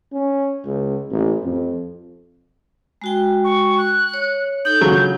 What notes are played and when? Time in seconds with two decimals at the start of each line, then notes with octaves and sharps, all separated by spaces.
0.13 C#4
0.65 C#2
1.11 A1
1.43 F2
3.02 G#3 F#4 G5
3.44 C#6
3.78 F#6
4.14 C#5
4.65 D#4 A4 G6
4.81 C#3 F#3 F4